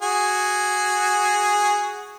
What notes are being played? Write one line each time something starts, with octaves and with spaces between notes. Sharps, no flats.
F#4 G#4